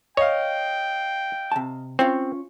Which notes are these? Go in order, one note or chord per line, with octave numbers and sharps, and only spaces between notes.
C#5 D#5 F5 G5
C3 A5
C4 C#4 F4 C#5